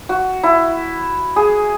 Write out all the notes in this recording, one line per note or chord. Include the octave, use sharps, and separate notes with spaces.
F#4
E4
G#4